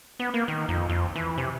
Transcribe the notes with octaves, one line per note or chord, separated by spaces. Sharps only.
B3
A#3
D#3
F2
F2
E3
C3